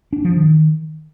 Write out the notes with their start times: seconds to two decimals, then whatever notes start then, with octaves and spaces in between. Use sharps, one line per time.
0.13 D4
0.25 F3
0.36 D#3